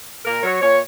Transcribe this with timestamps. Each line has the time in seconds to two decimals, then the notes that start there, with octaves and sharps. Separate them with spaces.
0.24 A#2 A#4
0.43 F#3 C#5
0.61 A#2 C#5